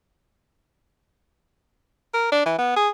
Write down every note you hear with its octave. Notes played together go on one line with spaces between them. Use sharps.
A#4
D4
E3
B3
G#4